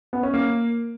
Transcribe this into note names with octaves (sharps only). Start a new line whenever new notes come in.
B3
C#4
A#3